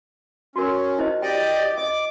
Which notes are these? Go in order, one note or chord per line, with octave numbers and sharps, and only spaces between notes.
C#4 F#4 A#4
E4 C5 D#5
G4 D5 D#5 G5
D#5 D6